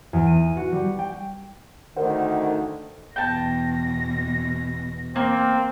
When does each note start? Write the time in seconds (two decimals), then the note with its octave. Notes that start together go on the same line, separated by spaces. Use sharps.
0.13 E2
0.26 D#7
0.57 F#4
0.72 G3
0.99 G5
1.96 D2 D3 D#3 A#4 C5 F#5
3.16 E2 B2 G5 A5 A#6
5.16 A#3 C4